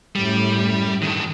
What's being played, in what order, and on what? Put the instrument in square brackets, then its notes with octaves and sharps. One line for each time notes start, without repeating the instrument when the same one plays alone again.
[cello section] F#2 A2 [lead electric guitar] G3
[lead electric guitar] G2 D#3